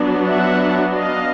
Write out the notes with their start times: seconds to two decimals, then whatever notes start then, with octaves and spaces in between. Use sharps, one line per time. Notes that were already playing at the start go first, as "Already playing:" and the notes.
Already playing: F#3 B3 D4
0.25 E5 F#5
0.95 D#5 F5